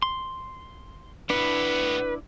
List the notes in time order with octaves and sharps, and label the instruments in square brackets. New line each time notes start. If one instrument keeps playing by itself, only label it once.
[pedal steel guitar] C6
[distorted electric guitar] A2 B3 [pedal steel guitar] D4 E4 [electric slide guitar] B4